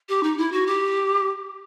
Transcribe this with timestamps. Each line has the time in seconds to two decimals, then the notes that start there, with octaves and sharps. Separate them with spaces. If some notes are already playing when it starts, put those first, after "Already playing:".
0.09 G4
0.23 D#4
0.38 E4
0.52 F#4
0.67 G4